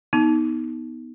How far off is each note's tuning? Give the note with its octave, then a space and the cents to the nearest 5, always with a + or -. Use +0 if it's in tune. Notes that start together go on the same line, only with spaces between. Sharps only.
B3 +0 D#4 +20